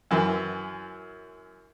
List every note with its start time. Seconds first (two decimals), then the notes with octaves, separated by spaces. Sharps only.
0.11 F#2 E3